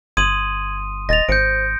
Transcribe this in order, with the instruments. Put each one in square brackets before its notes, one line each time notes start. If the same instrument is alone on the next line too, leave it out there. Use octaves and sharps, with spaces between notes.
[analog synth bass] G1 [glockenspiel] C6 D#6 D#7 [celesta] G#6 F#7
[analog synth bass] D#1 [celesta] D#5 A6 F7 [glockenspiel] A#6
[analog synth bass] G#1 [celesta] C5 [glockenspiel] G6 C#7 D7